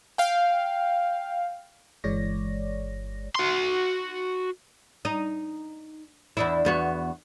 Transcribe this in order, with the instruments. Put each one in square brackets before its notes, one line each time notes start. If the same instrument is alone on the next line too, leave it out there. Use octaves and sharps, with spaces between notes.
[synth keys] F5 G5
[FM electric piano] G1 E3 G#3 C#5 D5 A#6
[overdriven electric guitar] F#4 C6
[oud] D#4
E2 D4 E4
E2 B3 F#4